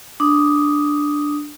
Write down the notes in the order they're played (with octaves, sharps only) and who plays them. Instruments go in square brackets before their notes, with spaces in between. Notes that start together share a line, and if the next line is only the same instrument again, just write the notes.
[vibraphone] D4 D#6